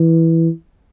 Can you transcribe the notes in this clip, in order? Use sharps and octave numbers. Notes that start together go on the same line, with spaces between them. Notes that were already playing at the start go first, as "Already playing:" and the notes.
Already playing: E3